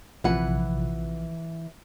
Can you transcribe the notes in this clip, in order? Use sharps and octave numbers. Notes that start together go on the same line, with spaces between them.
A#1 C3 E3 F3 B4 F#5